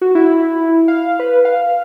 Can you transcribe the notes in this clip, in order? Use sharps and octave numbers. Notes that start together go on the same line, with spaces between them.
F#4
E4
F5
B4
F5